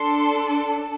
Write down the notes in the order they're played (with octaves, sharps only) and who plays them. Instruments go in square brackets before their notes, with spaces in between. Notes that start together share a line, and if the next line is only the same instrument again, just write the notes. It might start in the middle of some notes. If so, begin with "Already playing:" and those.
Already playing: [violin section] D4 A4 C6